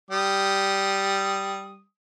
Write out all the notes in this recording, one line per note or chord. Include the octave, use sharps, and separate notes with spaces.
G3 D#6